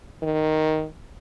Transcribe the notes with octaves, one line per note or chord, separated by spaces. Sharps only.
D#3